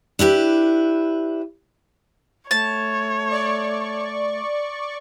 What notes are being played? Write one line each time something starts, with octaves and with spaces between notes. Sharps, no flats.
D4 E4 G4 B4
A3 C#5 A5
D5 C#6